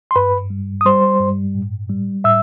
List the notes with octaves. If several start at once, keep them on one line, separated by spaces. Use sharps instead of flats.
C6
G2 B4 B5
G3
D#6
G3 C5 C6
G2
A2
G3
A2 E5 E6